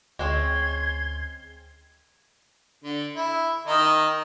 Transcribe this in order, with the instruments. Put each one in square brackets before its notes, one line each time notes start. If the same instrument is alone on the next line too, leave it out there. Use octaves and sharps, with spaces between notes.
[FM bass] D2 [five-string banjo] G#3 C4 C#4 [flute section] C6 G#6
[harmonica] D3
E4
D#3 D#4